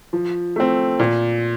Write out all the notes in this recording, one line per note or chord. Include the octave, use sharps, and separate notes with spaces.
F3
A3 C4
A#2